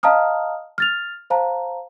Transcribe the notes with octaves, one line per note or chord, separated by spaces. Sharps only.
D#5 F5 A5 A#5 D#6 F6
F6 A6 F7
C5 F5 A5 A#5